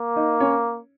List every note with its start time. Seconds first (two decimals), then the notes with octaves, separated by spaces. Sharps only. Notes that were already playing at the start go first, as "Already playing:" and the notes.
Already playing: A#3
0.16 D#4 D#5
0.40 C#4 C#5